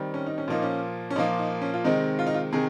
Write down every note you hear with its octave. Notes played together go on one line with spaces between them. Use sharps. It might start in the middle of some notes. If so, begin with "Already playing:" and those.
Already playing: D#3 G3 C4
C#4
D#4
C#4
A#2 F3 A#3 D#4
C#4
C#4
A#2 F3 A#3 D#4
D#4
C#4
F4
C3 D#3 G#3 C4 D#4
F4
D#4
F4
C3 D#3 G#4